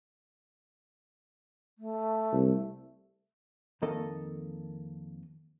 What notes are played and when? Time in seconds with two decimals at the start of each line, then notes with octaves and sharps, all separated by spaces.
1.78 A3
2.33 C2
3.82 F2 D#3 A#3 A4 D#5